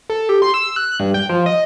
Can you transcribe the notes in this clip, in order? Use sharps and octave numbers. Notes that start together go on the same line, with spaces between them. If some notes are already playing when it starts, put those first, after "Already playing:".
A4
G4
C6
E6
F#6
G2
G5
F3
D#5